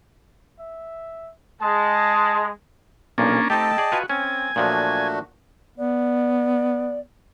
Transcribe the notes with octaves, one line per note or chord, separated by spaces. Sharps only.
E5
G#3 A5
B1 A#2 F3 A#3 C#4 D4
A3 C4 D#4 G4 D#5 G5 A5
G#4 D5
F4 F#4 B4 G#5
C4 C#4 G#5
A#2 F3 F#3 A3 D4 F#4
B3 D5